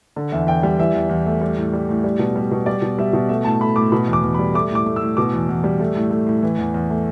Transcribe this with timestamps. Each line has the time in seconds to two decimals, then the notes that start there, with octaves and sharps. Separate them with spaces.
0.16 D3
0.32 E2 E5
0.47 E2 G5
0.63 G3 G5
0.79 E3 E5
0.94 E2
1.10 E2
1.26 A3
1.41 G3
1.57 A2
1.73 G3
1.89 A2
2.04 G3
2.19 B2
2.36 G3
2.51 B2
2.66 G3 D5
2.82 B2
2.98 G3 E5
3.13 B2
3.29 A3 E5
3.44 A2 A5
3.61 A3 B5
3.76 A2 D6
3.92 B2 B5
4.08 E2
4.13 D6
4.23 E2
4.34 B5
4.39 G3
4.54 A3 D6
4.71 A2 D6
4.86 A3
4.96 E6
5.01 A2
5.17 B2 D6
5.34 E2
5.49 E2
5.64 G3
5.80 A3
5.96 A2
6.11 A3
6.27 A2
6.43 E3
6.58 E2
6.74 E2
6.90 A3